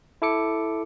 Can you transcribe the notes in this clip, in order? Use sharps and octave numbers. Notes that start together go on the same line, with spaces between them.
E4 A4 D6 C#7